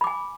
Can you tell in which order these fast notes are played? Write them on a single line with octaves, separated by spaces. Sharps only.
B5 D6 G#5